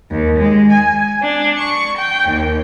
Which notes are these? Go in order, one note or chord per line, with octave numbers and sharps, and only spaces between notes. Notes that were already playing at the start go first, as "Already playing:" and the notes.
D#2
G#3
G#5
D4
C#6
G5
D#2